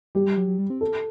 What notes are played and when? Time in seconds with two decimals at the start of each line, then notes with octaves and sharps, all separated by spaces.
0.15 G3 G4
0.26 G3
0.37 F#3
0.47 F#3
0.58 G3
0.70 C4
0.81 A4